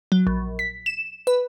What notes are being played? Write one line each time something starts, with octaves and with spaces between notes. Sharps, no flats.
F#3
A#1
B6
E7
B4